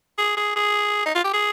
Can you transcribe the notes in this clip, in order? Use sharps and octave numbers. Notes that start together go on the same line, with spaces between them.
G#4
G#4
G#4
D#4
F4
G4
G#4